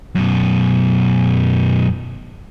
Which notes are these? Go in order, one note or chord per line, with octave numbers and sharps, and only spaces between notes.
F#2 B2